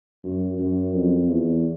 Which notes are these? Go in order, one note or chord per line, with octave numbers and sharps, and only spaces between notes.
F#2
F#2
F2
E2